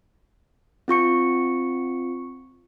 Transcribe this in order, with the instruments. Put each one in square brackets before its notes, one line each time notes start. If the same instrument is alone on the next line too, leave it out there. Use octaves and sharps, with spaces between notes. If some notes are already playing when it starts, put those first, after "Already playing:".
[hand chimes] C4 F4 C#6 C#7